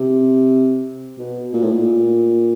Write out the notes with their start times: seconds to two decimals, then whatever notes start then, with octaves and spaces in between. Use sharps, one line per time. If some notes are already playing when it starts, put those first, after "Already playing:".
Already playing: C3
1.19 B2
1.53 A#2
1.62 A2
1.72 A#2